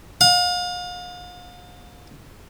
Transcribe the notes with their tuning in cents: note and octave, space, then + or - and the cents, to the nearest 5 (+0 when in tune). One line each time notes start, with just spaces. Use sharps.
F5 +40